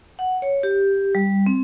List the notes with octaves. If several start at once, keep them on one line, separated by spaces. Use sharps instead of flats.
F#5
C#5
G4
G3
C4